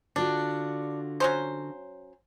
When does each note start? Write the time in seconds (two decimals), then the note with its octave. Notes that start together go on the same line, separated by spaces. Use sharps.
0.16 D3 D4 F4 F#4
1.20 F#3 C#4 C5